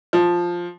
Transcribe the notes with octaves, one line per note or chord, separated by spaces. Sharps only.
F3